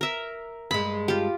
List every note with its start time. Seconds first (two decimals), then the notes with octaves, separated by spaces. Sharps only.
0.01 A#4 E5
0.71 G2 G#3 B5
1.08 F4 G4